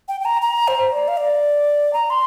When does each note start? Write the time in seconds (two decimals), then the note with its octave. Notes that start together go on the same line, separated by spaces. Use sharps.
0.08 G5
0.20 G5
0.25 A#5
0.42 A#5
0.68 C5
0.92 D5
1.08 F5
1.17 D5
1.93 A#5
2.10 C6